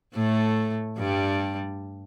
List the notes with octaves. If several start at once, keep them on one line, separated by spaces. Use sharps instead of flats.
A2 A3
G2 G3